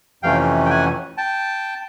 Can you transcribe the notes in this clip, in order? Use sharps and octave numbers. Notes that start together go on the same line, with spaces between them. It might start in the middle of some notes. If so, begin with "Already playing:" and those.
F2 C3 E3 A3 C#4 F5 G5
G5
F#5 G#5
G5 A5